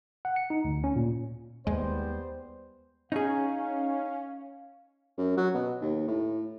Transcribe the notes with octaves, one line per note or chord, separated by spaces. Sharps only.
F#5
C#7
D#4
D2
C#4
A#2
D#2 G3 G#3 B3 C5
C#4 D#4 G#4 F5
F#2
F#3
B2
D#2
A2